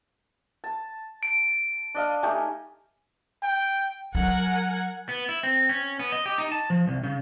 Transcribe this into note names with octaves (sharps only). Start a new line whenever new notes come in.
A5
D7
D4 D#5 F5
A3 D#4 G4 G#5
G5
F#3 A#4 F#5 G#5
B3
E4
C4
C#4
B3
D#5
G4
D#4
A5
F3
C2
C#3